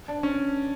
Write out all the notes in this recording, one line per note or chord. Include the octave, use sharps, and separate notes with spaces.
D4
C#4